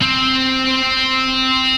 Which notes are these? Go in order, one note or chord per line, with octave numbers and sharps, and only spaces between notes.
C4